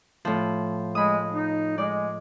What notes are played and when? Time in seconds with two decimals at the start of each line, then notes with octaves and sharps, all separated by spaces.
0.25 A2 F3
0.95 G#3 B5 D#6
1.32 D#4
1.78 G#3 D5